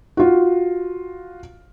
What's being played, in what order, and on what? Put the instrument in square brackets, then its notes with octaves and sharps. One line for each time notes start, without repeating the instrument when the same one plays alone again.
[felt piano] F4 F#4